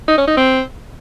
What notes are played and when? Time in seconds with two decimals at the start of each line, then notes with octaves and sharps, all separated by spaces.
0.08 D#4
0.18 C#4
0.27 D#4
0.37 C4